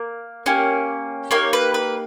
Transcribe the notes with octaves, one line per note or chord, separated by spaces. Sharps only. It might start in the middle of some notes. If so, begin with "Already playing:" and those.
Already playing: A#3
A#3 C#4 G4
A#3 D#4 G4 C#5
B4
B4